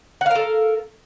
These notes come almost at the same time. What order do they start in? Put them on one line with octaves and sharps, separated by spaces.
F#5 F5 A#4 A4